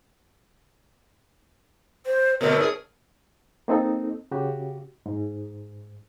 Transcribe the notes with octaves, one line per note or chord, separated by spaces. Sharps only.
C5
B2 D3 A3 A#4
G#2 G#4
A#3 C4 D#4 A4
C#3 F#4 G4
G#2